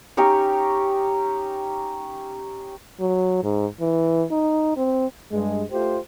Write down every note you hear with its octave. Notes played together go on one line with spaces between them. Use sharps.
C#4 D#4 G4 C#5
F#3
G#2
E3
D#4
C4
G2 G#3
A3 F4 G4 C5